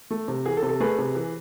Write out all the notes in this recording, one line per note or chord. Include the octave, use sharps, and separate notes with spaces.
A3
C3
E3 G#4
A4
C3
A4
A3 G#4 B4
C3
E3